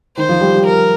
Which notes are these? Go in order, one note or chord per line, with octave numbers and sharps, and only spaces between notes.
D#3 C5
F3
G3
G3
A#4